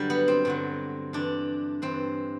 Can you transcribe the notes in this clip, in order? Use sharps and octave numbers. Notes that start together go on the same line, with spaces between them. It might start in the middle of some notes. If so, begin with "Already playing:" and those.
Already playing: G2 D3 F#3 G3
B3
C4
G2 D3 F#3
G2 E3 D4
G2 E3 C4